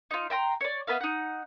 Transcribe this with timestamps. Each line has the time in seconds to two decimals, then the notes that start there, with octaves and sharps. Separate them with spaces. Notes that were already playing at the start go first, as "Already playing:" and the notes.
0.11 D#4 F4
0.30 E5 G5 A#5 C6
0.61 C#5 D5
0.87 B3 B4 E5 F5
1.00 D#4 F#5